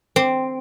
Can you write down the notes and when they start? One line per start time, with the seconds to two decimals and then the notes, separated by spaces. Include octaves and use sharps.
0.16 C4